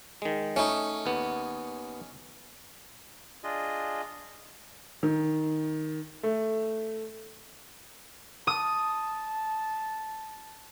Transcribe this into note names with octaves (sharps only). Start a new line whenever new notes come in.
D#3 G#3
A3 C#4 D#4
D#2 B3
D4 F4 G#4 D#5
D#3
A3
A5 D#6